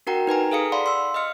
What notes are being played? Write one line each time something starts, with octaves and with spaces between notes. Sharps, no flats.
D4 F#4 A#4 F#5 G5 A#5
D#4 B4 G#5 A#5
G#4 A4 F5 D#6 C#7
D5 F5 F#5 B5 C6
C6 E6
D#5 F5 F6 C#7